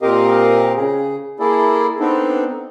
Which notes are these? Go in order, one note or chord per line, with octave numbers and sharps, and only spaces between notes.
A#2 C4 G4 A#4 D#5 F5
C#3 G#4
A#3 E4 G#4 A4 D5
B3 C4 D4 D#4 A4